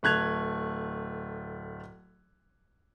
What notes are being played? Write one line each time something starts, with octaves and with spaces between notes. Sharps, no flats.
D1 A3 F#6 G#6 F7